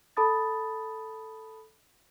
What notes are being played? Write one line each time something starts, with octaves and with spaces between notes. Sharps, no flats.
A4 A5 B5 D#6 A6